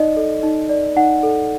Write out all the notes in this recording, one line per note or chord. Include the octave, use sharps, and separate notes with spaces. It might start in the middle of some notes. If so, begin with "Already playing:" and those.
Already playing: D#4 D5 D#5
A4
D#4
D5
D#4 F#5
A4